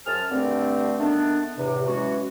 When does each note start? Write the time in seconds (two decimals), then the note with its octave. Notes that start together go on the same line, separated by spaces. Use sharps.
0.07 F#2 G#4 C5 A5 F6
0.32 G2 D3 A3 C4
1.00 D#3 A3 B3 D4
1.58 E2 A2 C3
1.87 E3 F#3 G#3 C#4 F#4